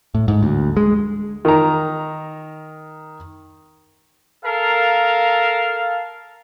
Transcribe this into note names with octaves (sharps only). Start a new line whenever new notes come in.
A2
G#2
D2
G#3
D#3 A#5
A4 A#4 F5